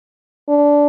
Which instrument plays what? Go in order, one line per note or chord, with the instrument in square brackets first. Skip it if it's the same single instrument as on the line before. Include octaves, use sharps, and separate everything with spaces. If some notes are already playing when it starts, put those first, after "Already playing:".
[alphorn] D4